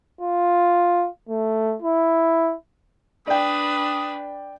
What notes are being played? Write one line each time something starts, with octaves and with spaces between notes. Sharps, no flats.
F4
A3
E4
D4 B4 D5 G5 D#6